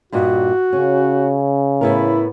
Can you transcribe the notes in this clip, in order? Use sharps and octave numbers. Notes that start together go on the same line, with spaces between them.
G2 A#2 D#4 F#4
C#3 C#4
A2 B3 E4 A#4